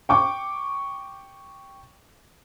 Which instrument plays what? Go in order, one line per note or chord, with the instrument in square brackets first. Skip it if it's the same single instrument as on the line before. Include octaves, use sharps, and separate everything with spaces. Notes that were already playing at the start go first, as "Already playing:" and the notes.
[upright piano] G5 C#6 D6